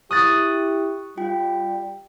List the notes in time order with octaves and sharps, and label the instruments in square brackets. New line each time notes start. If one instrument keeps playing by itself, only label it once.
[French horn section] E4 G4 [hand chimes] C#6 [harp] D#6 F#6 A6
[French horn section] G3 [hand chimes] F4 G5